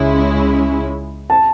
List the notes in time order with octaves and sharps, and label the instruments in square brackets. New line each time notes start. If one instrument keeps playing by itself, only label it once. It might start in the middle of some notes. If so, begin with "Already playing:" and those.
Already playing: [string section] C#2 C#3 G#3 C#4 E4
[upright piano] A5